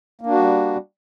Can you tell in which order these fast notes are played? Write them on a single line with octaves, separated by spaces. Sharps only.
A#3 D4 F#4 G3